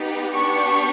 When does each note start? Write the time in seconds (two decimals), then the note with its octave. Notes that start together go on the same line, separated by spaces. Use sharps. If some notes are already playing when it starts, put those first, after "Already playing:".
Already playing: B3 D#4 G4
0.34 B3 D4 G4 C#6